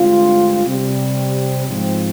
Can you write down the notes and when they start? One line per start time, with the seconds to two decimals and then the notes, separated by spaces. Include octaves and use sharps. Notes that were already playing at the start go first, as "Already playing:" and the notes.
Already playing: G2 D3 G#3 C4 F4
0.65 C3 G3 C4
1.67 G#2 F3 C4